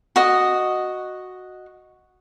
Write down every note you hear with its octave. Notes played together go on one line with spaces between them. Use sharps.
F#4 D#5